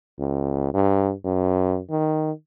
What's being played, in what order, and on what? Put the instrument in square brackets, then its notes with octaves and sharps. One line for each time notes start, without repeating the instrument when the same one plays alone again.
[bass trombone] C#2
G2
F#2
D#3